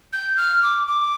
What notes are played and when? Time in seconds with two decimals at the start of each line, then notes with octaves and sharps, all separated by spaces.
0.13 G6
0.37 F6
0.63 D6
0.88 D6